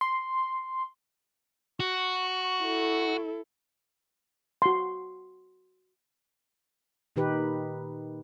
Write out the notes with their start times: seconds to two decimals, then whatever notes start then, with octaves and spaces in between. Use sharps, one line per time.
0.01 C6
1.80 F#4 C#6
2.62 E4 A4
4.62 F#4 C6
7.16 A#2 D#3 D#4 G4 B4